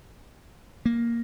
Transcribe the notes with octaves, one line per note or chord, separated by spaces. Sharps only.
A#3